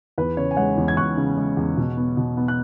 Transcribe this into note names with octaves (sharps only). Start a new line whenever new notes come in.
E2 B4
C#3 C#5
G#5
G#3 C#5 F#5
E2
G#6
E2 C#6 F#6
C#3
G#3
E2
B2
B3
B2
B3
F#6